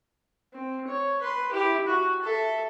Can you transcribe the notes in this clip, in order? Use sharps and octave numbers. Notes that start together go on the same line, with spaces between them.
C4
C#5
B4 C6
E4 G4
F#4
A4 E5